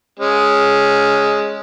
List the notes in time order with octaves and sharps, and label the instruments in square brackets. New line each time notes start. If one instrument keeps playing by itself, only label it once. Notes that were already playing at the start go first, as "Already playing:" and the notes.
[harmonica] G#3 C#4